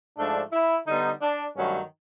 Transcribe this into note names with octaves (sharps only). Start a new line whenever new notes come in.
G#2 F3 A3 D4
E4
D3 G3 B3 D#4
D4
G2 D#3 F#3 A3 C#4